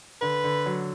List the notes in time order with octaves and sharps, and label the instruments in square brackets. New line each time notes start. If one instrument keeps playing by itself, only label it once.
[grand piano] D3 [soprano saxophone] B4
[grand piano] D3
F#3